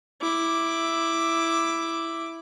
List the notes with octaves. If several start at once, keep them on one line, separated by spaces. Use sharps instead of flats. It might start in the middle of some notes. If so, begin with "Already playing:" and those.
E4 D6